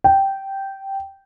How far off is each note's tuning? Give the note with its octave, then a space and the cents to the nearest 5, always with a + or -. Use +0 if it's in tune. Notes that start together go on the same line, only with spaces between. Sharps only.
G5 -10